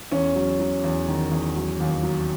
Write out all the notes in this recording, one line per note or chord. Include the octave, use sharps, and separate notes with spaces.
E2 C#4
F#3
F#3
E2
D#3
E2
F#3
D#2
F#3